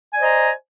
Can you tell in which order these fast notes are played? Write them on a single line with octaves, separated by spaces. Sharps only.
G#5 D5 C5 D#5 A#5